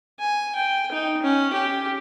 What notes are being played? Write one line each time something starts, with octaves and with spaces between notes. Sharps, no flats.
G#5
G5
D#4
C#4
G4